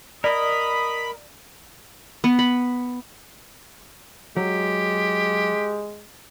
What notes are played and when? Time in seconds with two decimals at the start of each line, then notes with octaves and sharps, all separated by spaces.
0.24 A#4 D5 D#5 B5 D#6
2.24 B3
2.39 B5
4.37 F#3 G#3 G4